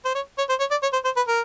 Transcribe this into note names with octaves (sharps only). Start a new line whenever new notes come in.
C5
C#5
C#5
C5
C#5
D5
C#5
C5
C5
B4
A#4